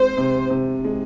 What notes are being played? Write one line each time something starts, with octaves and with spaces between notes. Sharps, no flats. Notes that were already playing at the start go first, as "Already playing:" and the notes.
Already playing: G#3 C4 C5
C3
C3
G#3